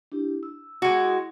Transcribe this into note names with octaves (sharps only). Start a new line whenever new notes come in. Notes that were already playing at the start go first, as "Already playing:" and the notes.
D4 E4 G4
E6
G#3 F#4
E4